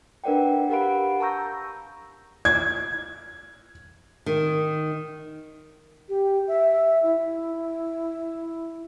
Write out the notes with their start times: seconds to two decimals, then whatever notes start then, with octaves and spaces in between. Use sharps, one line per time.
0.24 D4 A#4 B4 D5 F#5 G5
0.70 G4 A#4 F5 F#5 B5 D7
1.20 A5 A#5 C#6 E6 G6 A#6
2.45 G#6
4.26 D#3
6.08 G4
6.47 E5
7.02 E4